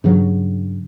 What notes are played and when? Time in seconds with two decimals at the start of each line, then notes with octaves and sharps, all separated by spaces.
0.04 G2 C#3 F#3